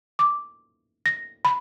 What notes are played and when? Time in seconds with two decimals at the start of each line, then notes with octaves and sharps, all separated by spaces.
0.19 D6
1.06 A#6
1.45 B5